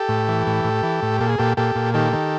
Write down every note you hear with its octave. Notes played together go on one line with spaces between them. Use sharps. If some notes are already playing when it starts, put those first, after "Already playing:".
Already playing: G4 A4
A2
E3
A2
A2
E3
A2
A#2 A4
G#4
A#2 G4 A4
A#2 G4 A4
A#2
D#3 G4 A4
D#3